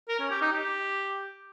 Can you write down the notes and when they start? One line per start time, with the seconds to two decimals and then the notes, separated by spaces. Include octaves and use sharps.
0.08 A#4
0.19 C#4
0.30 G4
0.41 D#4
0.52 G4